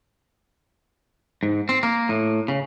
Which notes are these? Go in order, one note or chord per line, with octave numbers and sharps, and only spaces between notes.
G#2
C4
A#3
A2
C#3